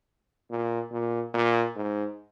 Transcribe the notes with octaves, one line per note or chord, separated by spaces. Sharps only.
A#2
A#2
A#2
G#2